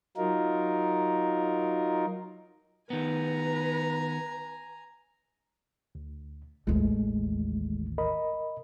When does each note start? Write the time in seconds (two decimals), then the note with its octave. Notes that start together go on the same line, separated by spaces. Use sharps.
0.17 F#3 D#4 F4 A#4
2.90 D#3 B3 B4 G#5 A#5
5.95 D2
6.67 A1 D#2 G#3 A3
7.98 A#4 D#5 B5